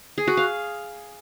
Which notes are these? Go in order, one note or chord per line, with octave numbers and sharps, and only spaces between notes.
G#4
F#4
F5